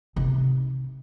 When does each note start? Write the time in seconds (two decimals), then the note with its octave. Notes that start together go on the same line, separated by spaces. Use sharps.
0.16 C3 D#4